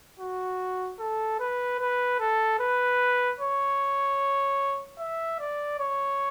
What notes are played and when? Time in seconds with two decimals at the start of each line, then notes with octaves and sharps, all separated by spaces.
0.19 F#4
0.99 A4
1.39 B4
1.79 B4
2.19 A4
2.59 B4
3.39 C#5
4.99 E5
5.39 D5
5.79 C#5